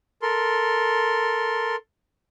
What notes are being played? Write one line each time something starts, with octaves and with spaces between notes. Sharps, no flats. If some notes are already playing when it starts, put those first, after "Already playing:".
A4 A#4 C6